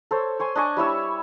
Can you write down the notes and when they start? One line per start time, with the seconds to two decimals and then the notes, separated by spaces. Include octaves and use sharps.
0.11 A4 C5 C#5
0.40 C#5 G#5 C6
0.55 D4 D#5 G#5 C#6
0.77 G3 E4 C#5 E6